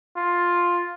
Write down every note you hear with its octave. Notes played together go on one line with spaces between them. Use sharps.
F4